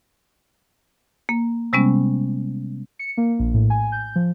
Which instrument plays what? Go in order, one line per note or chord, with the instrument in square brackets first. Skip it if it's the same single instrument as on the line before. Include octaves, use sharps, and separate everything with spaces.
[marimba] A#3
C3 G3 G#3 B3 C#4
[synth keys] C#7
A#3
A#1
A2
G#5
G6
F3